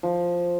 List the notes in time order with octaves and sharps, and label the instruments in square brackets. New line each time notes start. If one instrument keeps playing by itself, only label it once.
[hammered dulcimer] F3